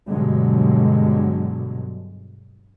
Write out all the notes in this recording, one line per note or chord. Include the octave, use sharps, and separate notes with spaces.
G2 B2 D3 F#3 G#3